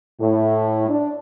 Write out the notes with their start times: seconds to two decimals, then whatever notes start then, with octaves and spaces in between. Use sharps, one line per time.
0.21 A2
0.89 D4